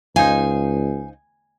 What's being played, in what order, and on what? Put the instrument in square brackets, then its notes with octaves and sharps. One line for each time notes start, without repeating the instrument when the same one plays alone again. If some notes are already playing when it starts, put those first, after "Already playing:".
[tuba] C#2 [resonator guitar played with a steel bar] D#4 C5 F5 [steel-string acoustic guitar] G#5